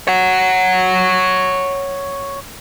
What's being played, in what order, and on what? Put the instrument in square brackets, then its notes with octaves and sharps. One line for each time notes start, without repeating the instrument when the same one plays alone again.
[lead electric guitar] C#5 F#5